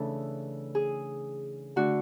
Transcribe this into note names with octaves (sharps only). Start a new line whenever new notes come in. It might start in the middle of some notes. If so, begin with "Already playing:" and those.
Already playing: C#3 E3 A3 D4 A4
G#4
D3 A3 D4 F#4